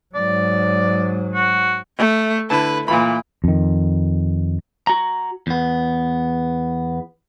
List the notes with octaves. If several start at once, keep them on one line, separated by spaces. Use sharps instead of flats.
G#2 F#3 D5
F#4
A3
D3 E4 B4 A5
A#2 E3 F4 B5
F2 D#3
F#4 A#5
E2 B3